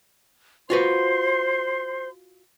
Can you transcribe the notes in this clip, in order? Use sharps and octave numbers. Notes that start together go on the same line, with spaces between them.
F4 F#4 B4 C5 C6